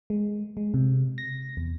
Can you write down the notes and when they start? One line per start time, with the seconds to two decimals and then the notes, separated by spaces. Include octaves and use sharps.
0.10 G#3
0.57 G#3
0.74 C3
1.18 A#6
1.57 E2